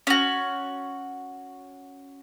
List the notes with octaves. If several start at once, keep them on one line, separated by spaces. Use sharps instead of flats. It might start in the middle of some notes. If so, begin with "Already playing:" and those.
C#4 F#4